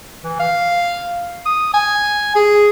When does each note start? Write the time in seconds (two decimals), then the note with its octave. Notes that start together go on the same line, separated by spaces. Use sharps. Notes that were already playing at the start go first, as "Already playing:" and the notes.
0.23 E3
0.39 F5
1.46 D#6
1.74 G#5
2.35 G#4